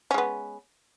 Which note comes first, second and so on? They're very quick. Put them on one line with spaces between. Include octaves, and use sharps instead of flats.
C#4 G#3 B3